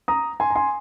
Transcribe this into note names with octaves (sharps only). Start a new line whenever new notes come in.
A#5 D#6
G#5 C6
A#5
G#5 C6